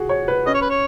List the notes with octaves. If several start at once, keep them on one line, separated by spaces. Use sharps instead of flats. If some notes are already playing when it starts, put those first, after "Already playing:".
Already playing: F#4 G#4
C#5
B4
C#4 D#5
C#5
B4
C#5